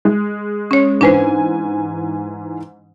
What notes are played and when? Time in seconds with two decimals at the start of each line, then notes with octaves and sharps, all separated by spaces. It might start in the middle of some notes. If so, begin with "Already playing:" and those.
0.05 G#3
0.71 C#4 C#5
1.01 G#2 E3 D4 B4 C5 G#5